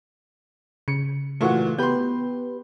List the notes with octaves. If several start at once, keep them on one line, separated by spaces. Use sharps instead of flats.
C#3 C#7
A#2 E3 A3 F#4 F#5 C#6
B3 G4 B4 C6 G6